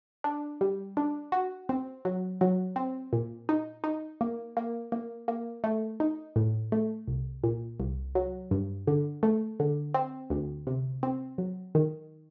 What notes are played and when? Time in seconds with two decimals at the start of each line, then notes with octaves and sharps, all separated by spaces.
0.24 D4
0.61 G3
0.97 D4
1.32 F#4
1.69 C4
2.05 F#3
2.41 F#3
2.76 C4
3.13 A#2
3.49 D#4
3.84 D#4
4.21 A#3
4.57 A#3
4.92 A#3
5.28 A#3
5.64 A3
6.00 D#4
6.36 A2
6.72 A3
7.07 C2
7.44 A#2
7.80 C2
8.15 F#3
8.51 G2
8.87 D3
9.23 A3
9.60 D3
9.94 C4
10.30 D2
10.67 C3
11.03 C4
11.38 F#3
11.75 D#3